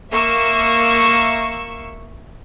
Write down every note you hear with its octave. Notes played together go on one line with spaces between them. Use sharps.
A#3 E5 C#6 E6